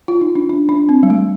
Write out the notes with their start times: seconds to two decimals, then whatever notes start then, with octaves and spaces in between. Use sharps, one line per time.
0.08 F4
0.21 D#4
0.35 D4
0.49 D4
0.69 D4
0.89 C4
1.03 G3
1.10 A3